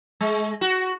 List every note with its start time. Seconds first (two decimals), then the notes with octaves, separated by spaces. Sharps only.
0.21 G#3
0.61 F#4